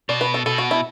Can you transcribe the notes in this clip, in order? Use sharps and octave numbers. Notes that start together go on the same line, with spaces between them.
B2 D5
B4
A4
B2 A4
F#4
E4